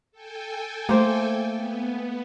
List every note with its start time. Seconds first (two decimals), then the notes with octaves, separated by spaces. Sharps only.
0.12 A4 G5 G#5
0.89 A3 A#3 C5
1.51 B3